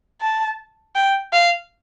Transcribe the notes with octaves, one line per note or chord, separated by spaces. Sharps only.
A5
G5
F5